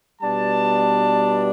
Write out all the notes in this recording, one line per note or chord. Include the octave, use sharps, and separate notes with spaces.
B2 G3 B3 D4 A5